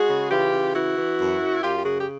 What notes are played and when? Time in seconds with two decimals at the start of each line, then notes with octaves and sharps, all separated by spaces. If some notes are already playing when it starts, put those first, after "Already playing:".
Already playing: G#3 F#4 G#4
0.09 C#3
0.31 E3 F4 G4
0.53 C#3
0.74 E3 E4 F#4
0.96 E3
1.19 F#2
1.40 F#2
1.62 F#2 F4 G4
1.78 G4
1.84 C#3 F#4 G#4
1.99 G4